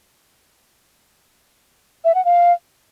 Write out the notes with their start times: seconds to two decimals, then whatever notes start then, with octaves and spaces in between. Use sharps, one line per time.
2.05 E5
2.15 F#5
2.25 F5